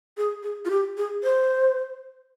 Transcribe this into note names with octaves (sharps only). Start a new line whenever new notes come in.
G#4
G#4
F4
G4
G#4
C5